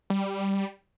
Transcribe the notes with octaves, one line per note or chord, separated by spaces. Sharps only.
G3